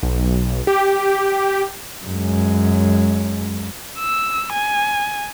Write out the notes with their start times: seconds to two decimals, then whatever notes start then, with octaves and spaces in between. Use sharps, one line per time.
0.03 B1
0.67 G4
2.05 F#2 G#3
3.99 E6
4.53 G#5